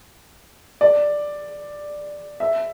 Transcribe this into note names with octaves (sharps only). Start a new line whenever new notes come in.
D5
E5